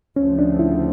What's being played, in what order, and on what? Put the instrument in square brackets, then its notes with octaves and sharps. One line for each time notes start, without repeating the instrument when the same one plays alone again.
[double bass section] D2 C#3 F3 A3 C4 [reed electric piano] C#4
[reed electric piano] D4
E4